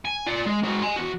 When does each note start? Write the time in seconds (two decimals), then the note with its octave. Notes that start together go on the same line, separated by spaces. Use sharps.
0.05 G#5
0.26 F4 D5
0.46 G#3
0.63 G#3 F#4
0.82 G#5 C6
0.96 E2 F#4